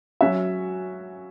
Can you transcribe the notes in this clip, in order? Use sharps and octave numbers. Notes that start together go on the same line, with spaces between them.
F#3 C#4 F#4 E5